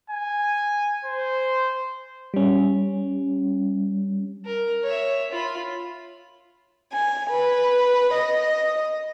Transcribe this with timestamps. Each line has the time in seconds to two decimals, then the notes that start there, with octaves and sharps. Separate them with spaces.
0.10 G#5
1.05 C5
2.34 G3 C#4
4.45 A#4
4.84 C#5 E5
5.32 F4 B5
6.93 G#5
7.30 B4
8.14 D#5